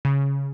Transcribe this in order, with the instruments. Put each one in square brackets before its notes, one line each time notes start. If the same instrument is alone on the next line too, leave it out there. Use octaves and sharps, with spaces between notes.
[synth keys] C#3